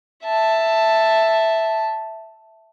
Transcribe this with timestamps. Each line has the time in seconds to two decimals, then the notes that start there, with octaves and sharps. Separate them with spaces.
0.24 E5 A5